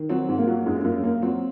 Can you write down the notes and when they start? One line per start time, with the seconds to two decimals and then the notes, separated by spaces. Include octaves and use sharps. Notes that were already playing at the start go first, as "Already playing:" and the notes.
Already playing: D#3
0.09 F#3 C4
0.29 G#2
0.38 A#3
0.47 F#3
0.66 F#2 G#3
0.79 G#3
0.84 F#2 A#3
1.03 F#2 A#3
1.22 F#3 C4